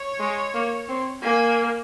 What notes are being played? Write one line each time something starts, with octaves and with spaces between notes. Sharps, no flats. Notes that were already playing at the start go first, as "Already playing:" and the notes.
Already playing: C#5
G#3
A#3
C4
A#3 G#5